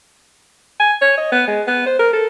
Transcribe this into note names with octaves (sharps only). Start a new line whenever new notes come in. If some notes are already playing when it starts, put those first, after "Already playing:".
G#5
C#5
D#5
B3
G#3
B3
C5
A#4
A4